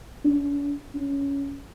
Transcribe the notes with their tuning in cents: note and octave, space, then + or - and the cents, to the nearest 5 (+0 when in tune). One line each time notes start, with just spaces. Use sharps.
C#4 +45
C#4 +10